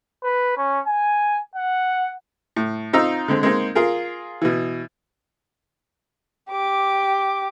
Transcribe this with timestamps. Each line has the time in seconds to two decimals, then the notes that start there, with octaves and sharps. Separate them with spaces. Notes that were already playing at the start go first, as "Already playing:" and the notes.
0.23 B4
0.57 C#4
0.87 G#5
1.55 F#5
2.56 A2
2.93 C4 D#4 F4 A#5 E6
3.28 D3 G#3 C4
3.43 G#3 A#3 C4 D#4
3.75 F4 G#4 A#4
4.42 B2 E3
6.51 G4 D6